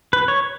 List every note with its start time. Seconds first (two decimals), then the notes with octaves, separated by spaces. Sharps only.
0.13 B4
0.28 C#5